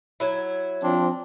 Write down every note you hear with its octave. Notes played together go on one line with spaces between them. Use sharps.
F#3 E4
F3 C4 D4